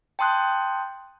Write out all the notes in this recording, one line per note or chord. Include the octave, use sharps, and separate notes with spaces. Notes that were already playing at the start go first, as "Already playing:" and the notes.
G5 A5 C6 D#6 F#6 G6